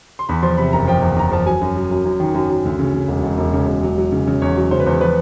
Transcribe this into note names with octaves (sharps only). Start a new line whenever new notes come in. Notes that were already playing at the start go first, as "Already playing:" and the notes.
C6
E2 B5
F3 C6
C3 B5
F#1 A#5
F3 G5
E2
E2 A#5
F3 A5
F#3 G#5
F#2
F#3
F#2
F#2
D#3
F#2
F#2
D2
C#3
C#3
E1
E1
E1
C#3
E1
F#3
F#3
C#3
C#3
E2 C#5
F#3
C#3 C5
B4
E2 C5
F3 B4